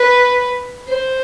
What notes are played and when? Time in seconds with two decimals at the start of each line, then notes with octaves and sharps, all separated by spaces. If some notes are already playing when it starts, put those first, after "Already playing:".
Already playing: B4
0.88 C5